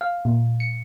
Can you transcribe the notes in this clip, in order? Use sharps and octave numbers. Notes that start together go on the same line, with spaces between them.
F5
A#2
C#7